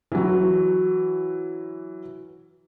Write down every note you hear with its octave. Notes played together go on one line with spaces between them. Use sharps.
E3 F#3